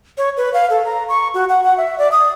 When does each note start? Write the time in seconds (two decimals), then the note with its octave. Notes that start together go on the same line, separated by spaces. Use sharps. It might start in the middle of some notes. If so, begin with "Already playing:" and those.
0.18 C#5
0.37 B4
0.54 F5
0.70 A4
0.85 A#5
1.09 C#6
1.34 F#4
1.49 F#5
1.64 F#5
1.78 E5
1.98 D5
2.12 D#6